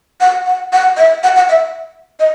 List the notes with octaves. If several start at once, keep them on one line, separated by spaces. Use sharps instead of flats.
F#5
F#5
F#5
E5
F#5
F#5
E5
D#5